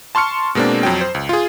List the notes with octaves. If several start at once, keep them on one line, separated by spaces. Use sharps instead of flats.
A5 C6 C#6 F6 C#7
B2 G#3 A#3 C4 D4
F2 F#3 G5
C5
C#2
F4 G#4